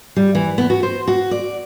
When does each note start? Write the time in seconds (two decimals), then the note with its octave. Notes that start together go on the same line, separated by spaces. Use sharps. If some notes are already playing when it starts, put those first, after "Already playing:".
0.16 G3
0.35 E3
0.58 B3
0.70 F#4
0.83 C5
1.07 F#4
1.31 D5